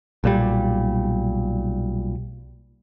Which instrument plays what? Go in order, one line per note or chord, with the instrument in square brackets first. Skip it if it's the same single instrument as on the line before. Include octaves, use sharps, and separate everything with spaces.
[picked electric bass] B1 A#2 G3